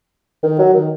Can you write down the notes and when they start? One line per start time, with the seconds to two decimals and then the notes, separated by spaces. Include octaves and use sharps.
0.43 D#3
0.59 F#3
0.74 D#3